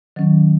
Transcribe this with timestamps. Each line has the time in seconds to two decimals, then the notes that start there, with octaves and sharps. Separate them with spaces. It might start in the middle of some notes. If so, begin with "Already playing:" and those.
0.16 D#3 F#3 C#4